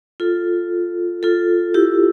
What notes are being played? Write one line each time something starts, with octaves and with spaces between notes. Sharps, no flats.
F4 A4
F4 A4
E4 G4